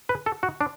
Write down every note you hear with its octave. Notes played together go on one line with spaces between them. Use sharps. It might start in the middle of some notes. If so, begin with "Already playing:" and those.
B4
A4
F#4
D4